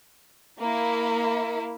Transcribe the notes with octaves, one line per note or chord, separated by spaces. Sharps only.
A#3 E4